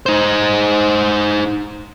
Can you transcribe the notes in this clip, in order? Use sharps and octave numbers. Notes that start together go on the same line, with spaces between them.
D#4 C5